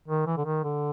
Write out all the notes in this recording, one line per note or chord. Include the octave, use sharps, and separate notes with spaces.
D#3
E3
D3
D#3
D3